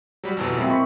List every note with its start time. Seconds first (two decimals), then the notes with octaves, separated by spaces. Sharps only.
0.24 F#3 G3 G4 B5
0.37 G#1 F2 B2 E4 A#5 E6
0.57 A#2 F#3 G#3 C4 E5 B5
0.70 A#4 D#5 B5 C#6